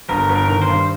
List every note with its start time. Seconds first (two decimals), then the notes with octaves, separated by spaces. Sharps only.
0.09 G1 A#4
0.29 G1
0.36 A#4
0.48 D#3
0.62 C5
0.68 G2